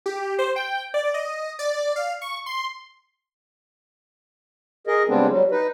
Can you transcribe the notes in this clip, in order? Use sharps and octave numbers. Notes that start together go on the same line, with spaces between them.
G4
C5
G5
D5
D#5
D5
F5
C#6
C6
G#4 A#4 D#5
C#3 G3 G#3 B3 C4 D4
F#3 G3
D#4 B4